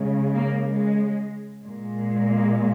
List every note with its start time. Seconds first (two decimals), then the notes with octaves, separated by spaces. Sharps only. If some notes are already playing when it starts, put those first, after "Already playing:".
Already playing: C#3 G#3
0.34 A#3
0.66 G#3
1.63 A#2 G#3
2.29 A#3